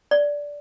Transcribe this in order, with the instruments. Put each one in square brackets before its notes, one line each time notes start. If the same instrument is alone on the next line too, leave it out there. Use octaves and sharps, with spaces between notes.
[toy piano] D5